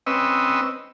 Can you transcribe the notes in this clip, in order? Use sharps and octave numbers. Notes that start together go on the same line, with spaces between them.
C4 C#4 B4 D#5 E6